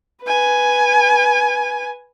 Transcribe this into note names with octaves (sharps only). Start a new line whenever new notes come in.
B4 G#5